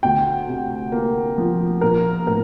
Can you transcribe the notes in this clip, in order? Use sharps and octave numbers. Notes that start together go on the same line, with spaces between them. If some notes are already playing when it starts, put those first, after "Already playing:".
D2 G5
C3
A#3
F3
A#1 A#4
A2 A#4